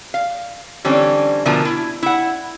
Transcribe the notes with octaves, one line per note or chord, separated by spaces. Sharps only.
F5
D3 E3 G3 C4 C#4
B2 D3 F3 A3 A#4 G#5
E4
E4 F#5